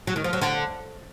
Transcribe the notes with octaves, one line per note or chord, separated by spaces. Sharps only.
F#3
D#3
F3
F#3
D3